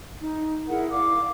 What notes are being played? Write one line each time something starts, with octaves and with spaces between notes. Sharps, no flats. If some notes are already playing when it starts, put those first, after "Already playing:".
D#4
E4 G#4 A#4 F#5
D5 F5 D6